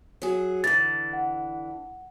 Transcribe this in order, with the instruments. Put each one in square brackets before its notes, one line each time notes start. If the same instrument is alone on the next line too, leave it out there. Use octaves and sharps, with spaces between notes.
[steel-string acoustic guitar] F#3 G#4
[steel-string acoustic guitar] D3 E3 [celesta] A6
[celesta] F#5